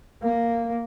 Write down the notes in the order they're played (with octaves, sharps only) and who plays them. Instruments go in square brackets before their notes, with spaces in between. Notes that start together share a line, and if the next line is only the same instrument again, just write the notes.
[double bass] A#3